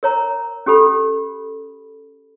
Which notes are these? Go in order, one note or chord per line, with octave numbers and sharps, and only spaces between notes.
A#4 C#5 A#5
C#4 G4 A4 B5